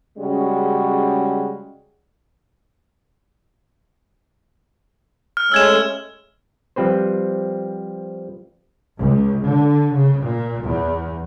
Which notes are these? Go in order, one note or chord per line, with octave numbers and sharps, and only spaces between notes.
C#3 G3 G#3 C#4 F#4
F6
G#3 A3 C#4 E6 G#6 E7
F3 G3 C4 B4 C5
C#2
D3
C#3
A#2
E2